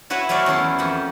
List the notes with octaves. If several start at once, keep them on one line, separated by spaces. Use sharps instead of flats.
E4 F#4 B4 C#5 E5 F#5
F#3 A3 A#4 C#5 D5
E2 C#4 E4 C6
F2 G4 F#5